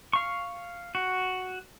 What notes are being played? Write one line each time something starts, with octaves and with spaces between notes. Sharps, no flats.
F5 C#6
F#4